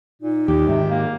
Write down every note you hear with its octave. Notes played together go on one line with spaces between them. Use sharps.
A#2 D#4
D#2 G4
G#2 C3 D#3
A#3